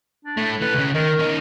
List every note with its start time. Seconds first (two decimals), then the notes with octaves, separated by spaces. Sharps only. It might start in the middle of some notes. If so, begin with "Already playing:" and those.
0.25 D4
0.37 A2 A3
0.61 E3 A4 B4
0.74 C#2 C#3
0.94 D#3 A#4
1.19 C#4 D#4